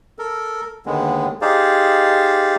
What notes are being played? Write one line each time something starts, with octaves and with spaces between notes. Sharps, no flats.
A4 A#4
D#2 D3 D#3 G#3 B3
D#4 G4 G#4 C5 D5 F5